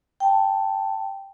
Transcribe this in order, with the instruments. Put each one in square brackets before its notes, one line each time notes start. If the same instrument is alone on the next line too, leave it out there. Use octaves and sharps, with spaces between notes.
[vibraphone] G5 A5